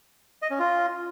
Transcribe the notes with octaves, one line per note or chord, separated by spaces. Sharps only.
D#5
C#4
F4